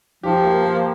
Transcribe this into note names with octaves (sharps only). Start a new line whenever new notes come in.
F3 G4
A#3
A#3